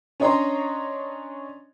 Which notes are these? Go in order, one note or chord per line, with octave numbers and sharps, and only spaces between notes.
C#4 D4 C#5 D#5 A#5 C6